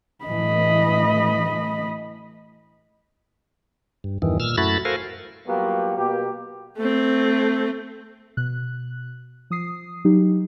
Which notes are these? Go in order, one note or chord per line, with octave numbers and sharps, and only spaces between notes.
A2 E3 A3 D#5 B5
G2
E2 G2 D#3 E3
A#2 E6 F6
F#2 A3 E4 F#4 B5 A6
F#4 A4 A#4 C5 F5 G#5
F#3 G3 A#3 B3 F4 G4
B2 A#3 G4
A3 C4
B2 F#6
F3 D#6 C7
F#3 D#4 G4